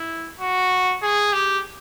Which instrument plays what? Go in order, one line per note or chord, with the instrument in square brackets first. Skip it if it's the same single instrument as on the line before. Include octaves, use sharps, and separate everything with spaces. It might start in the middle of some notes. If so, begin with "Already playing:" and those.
Already playing: [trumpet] E4
F#4
G#4
G4